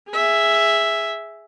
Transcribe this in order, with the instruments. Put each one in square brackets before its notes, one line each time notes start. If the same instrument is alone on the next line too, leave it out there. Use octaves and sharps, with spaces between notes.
[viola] G#4 E5